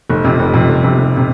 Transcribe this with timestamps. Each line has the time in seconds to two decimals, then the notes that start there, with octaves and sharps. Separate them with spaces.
0.10 F1
0.24 F2 C3
0.39 F1
0.54 F2 C3
0.69 F1
0.83 F2 C3
0.98 F1
1.17 C3